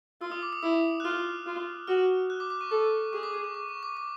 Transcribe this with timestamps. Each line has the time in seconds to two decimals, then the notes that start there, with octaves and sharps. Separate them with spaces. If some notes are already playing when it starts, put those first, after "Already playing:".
0.21 F4 E6
0.32 D#6
0.42 D6
0.53 D#6
0.62 E4 E6
1.00 F#6
1.04 F4 F6
1.46 F4
1.87 F#4 F6
2.30 F#6
2.40 D6
2.50 D6
2.61 C#6
2.71 A4 D6
3.13 G#4 C#6
3.23 D6
3.34 D6
3.44 C#6
3.55 D6
3.69 C#6
3.83 D6
3.97 D6